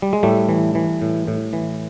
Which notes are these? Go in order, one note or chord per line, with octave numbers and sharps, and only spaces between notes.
G3
G#3
A2 G3 A3
E3
E3
A2
A2
E3